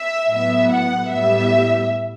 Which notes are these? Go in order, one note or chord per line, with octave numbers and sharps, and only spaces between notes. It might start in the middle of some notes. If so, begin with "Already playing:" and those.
Already playing: E5
A2 F#3 B3 E5
F#5
A2 G3 B3 E5